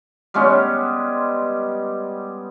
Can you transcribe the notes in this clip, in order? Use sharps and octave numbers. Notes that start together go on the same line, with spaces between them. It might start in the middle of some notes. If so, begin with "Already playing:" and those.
G3 G#3 B3 C#4